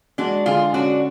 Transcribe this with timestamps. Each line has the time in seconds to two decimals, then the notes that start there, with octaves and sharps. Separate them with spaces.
0.18 G#3 D4 F#4
0.46 D3 F4 G#4
0.74 C#4 D4 F#4